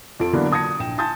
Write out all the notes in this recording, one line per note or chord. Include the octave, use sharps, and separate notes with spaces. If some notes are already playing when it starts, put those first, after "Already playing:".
F2 F3 A4 D7
D3 E3 F#3 A#3 B3 D4
A5 D#6 G#6 A#6 C#7
A#1 G5 E7
G#5 A5 C6 D#6 G6 A6